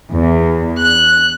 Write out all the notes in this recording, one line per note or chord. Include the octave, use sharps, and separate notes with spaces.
E2
F#6